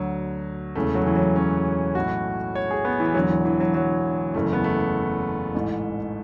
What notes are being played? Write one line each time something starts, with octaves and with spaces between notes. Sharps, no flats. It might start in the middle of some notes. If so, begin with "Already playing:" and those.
Already playing: D2 D3 F#3
E1 E2 C#3 E3 A3
F#3
E3
F#3
C#4
B1 A2 E3 F#4
C#5
G#4
B3
E3
E1 E2 D3 F#3
E3
E3
F#3
F#3
F#1 E2 C#3 E3 A3
B3
A3
A1 G#2 E3